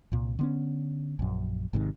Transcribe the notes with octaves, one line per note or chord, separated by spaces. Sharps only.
C2 A#2
D3 B3 C#4
A#1 F#2
G#1 G#2 C3 D#3